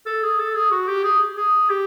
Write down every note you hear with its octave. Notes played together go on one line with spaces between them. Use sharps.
A4
G#4
A4
G#4
F#4
G4
G#4
G#4
G4